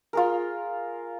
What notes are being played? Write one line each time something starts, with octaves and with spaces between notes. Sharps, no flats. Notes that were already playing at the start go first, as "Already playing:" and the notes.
F4 G#4 A#4